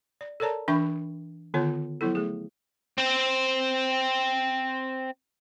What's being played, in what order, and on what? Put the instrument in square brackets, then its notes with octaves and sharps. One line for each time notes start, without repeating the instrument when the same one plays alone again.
[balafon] D5
A4 A#4 C#5 D5 A5 A#5
E3 D4 E5 G5 B5 C#6
D3 D#3 B3 F4 C#5
F3 F#3 B3 E4 A4
A3 G#4
[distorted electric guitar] C4 C5